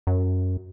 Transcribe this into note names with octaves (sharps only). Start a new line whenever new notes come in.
F#2